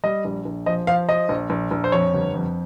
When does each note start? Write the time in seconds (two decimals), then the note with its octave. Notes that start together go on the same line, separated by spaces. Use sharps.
0.04 G3 D#5
0.25 A#1
0.45 A#1
0.66 F3 D#5
0.87 F3 F5
1.09 F3 D#5
1.29 A#1
1.50 A#1
1.71 A#1
1.84 C5
1.92 F2 C#5
2.13 G1
2.34 F2